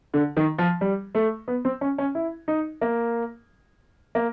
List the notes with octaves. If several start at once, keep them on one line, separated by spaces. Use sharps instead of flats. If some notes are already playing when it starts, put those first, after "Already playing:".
D3
D#3
F3
G3
A3
B3
C4
C#4
C#4
E4
D#4
A#3
A#3